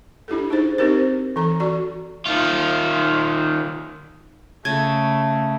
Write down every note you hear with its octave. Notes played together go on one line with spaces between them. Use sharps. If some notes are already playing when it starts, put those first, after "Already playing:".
D4 E4 G4 A4
D#4 G#4 C5
C4 D#4 G4 A#4 C5
E3 A4 A#5
F#4 D5 C#6
D#3 F4
C#3 A3 G#6